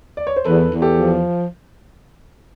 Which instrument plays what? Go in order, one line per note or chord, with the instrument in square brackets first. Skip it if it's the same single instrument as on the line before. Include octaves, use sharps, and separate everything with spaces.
[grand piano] D5
C#5
C5
[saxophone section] E2 [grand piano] A4 B4
[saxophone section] E2
[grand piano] G4 A4
[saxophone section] F3